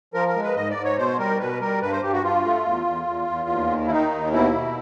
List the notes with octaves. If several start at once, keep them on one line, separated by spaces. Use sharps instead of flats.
F3 A#4
A#4
G#3
B4
G#2 D#5
D5
G#2
C#5
B2 C5
G3 A#4
B2 B4
G3 A#4
G2 B4
C5
G2 G4
F#4
G2 F4
A3
E2
E2
E2
E2
D#2
D#3
E4
D#3 D#4
D#2
B2 E4
B2